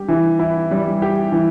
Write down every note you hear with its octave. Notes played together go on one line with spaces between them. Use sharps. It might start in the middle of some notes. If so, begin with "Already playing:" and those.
Already playing: G3 G4
E3
E4
G3
G4
E3